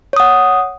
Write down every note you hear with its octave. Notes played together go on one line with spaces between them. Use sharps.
C#5 F#5 D#6